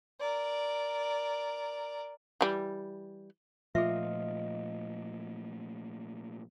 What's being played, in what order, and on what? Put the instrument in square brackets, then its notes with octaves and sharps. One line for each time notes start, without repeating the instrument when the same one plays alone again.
[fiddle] A#4 D5
[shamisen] E3 G3
[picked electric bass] A#2 F3 A3 [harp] F4 D#5 [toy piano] G#4 E5